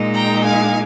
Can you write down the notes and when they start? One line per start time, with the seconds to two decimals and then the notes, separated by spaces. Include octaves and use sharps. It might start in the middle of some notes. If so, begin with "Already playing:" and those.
Already playing: A#2 G#3 D#4
0.14 G5 A#5
0.45 F5 G#5